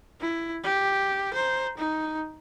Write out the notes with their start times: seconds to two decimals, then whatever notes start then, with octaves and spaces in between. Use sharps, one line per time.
0.21 E4
0.64 G4
1.34 C5 A#5
1.78 D#4